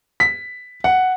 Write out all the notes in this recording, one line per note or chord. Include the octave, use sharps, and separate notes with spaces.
B6
F#5